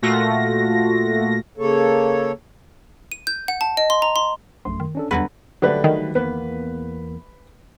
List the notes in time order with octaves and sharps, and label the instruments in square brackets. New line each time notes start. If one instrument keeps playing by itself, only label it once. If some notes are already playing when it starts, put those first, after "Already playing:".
[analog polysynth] A#2 A3 F4 F#4 A#6
[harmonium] C#3 A#3 A4 C#5
[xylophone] D#7
G6
F#5
A5
D#5
C6
A#5
C6
[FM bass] A#1 [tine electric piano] F#2 A3 C6
[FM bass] D#3
[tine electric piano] C#4 D4 A4
[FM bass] E2 [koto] D3 F#3 B4 [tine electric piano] G3 B3
[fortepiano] D3 B4 [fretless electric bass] F#3 G3 A3
[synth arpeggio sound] D#3
[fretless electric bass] E2 A#3 B3 [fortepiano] B4